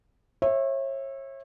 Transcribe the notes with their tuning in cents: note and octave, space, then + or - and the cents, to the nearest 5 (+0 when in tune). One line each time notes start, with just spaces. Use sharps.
C#5 -35 E5 +0